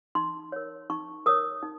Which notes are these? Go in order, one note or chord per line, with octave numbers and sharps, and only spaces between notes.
D#4 C6
A#4 C#5
D#4 C#6
A#4 C#5 D#6
D#4